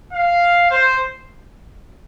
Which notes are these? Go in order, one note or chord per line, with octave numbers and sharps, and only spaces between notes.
F5
C5